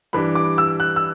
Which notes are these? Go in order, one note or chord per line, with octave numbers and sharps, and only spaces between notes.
G2 E3 G3 D4 B5
D6
E6
F#6
E6